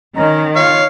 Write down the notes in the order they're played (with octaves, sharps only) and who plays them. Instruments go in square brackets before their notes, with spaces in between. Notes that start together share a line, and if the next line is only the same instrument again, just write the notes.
[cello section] D#3 [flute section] C#4 D#5 A#5
[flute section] F4 [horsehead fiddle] C#5 [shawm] F5